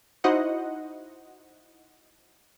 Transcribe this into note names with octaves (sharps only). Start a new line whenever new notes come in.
D#4 E4 F#4 C5 D#5 F#5